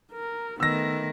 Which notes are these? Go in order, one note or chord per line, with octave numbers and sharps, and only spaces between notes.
A#4
D#3 A3 B3 E6 A#6